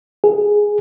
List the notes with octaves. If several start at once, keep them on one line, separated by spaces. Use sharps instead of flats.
G#4